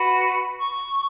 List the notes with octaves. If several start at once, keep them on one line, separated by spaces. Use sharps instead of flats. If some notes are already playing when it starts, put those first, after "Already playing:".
Already playing: F#4 B4
C#6